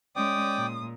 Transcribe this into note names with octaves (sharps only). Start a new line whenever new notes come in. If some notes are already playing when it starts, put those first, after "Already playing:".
G#3 C#4 D5 G5 D6 D#6
A#2